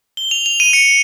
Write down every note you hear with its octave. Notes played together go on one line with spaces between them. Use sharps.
G7
F7
F7
D#7
C#7